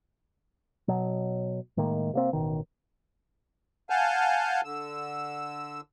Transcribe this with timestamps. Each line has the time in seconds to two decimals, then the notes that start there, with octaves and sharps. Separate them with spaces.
0.88 B2 F#3
1.77 A2 D#3 G#3 A#3
2.13 C3 A#3 C4
2.33 A1 B2 D#3
3.90 F5 F#5 G#5 A5 F6 G6
4.64 D3 E6